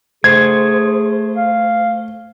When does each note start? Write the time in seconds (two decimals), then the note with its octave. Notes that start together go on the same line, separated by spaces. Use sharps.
0.24 A3 G#4 C5 G#6
1.36 F5